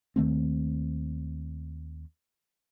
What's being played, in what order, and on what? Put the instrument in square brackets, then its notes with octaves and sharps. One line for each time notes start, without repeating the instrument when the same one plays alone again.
[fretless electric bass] D#2 D#3 A3 C4